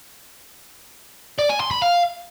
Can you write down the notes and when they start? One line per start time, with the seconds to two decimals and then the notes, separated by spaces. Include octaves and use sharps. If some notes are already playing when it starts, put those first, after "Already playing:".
1.39 D5
1.49 G#5
1.60 C6
1.71 B5
1.82 F5